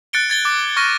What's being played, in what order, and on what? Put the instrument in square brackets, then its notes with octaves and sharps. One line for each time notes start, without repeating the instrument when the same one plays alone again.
[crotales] F#6 A6 C#7 D7 G7
G#6 A6 G7
D6 A6
C#6 F6 A#6 D#7